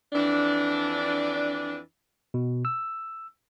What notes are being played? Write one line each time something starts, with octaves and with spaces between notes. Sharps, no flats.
F2 E3 D4
B2
E6